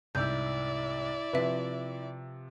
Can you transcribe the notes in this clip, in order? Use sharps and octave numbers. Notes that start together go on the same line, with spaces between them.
C2 G#2 E4 D5 E6 G6
C3 F3 B4 E5